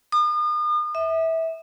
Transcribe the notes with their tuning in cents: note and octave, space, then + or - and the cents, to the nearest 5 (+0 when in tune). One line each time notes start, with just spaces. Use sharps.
D#6 -40
E5 -20